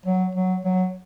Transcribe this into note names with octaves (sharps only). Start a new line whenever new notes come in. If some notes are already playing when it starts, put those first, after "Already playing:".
F#3
F#3
F#3